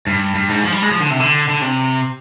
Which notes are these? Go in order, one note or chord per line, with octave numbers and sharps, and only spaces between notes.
G2
G2
G#2
F3
G3
G#3
F3
D3
C3
D3
D3
C3